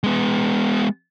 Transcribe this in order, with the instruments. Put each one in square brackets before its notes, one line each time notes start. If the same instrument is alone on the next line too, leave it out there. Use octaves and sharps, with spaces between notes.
[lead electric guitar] G#3 B3